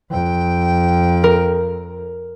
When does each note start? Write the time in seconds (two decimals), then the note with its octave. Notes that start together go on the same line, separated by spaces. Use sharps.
0.10 F2 G5
1.24 A#4